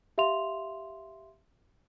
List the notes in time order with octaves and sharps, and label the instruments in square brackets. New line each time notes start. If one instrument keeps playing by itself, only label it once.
[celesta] G4 E5 F5 C6 F7